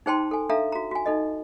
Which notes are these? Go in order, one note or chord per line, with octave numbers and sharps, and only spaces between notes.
D#4 G#4 C5 G5 A5 C6
A4 G#5
D4 A4 E5 F5 A#5
F#4 A#5
F#4 G#5
D#4 A4 D#5